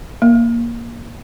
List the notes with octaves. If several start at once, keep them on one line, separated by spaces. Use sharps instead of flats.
A#3